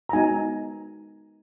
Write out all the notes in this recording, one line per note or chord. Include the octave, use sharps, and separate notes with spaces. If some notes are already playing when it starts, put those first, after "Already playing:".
A#5
G#3 B3 D#4 F#4 G#5